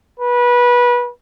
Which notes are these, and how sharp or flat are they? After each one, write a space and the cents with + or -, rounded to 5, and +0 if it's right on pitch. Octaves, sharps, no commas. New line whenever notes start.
B4 -25